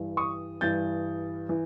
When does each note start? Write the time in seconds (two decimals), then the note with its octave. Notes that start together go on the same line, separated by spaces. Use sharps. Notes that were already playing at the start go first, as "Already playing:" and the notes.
Already playing: G2 E3
0.17 C#6 D#6
0.61 G2 E3 G6 A6
1.49 E3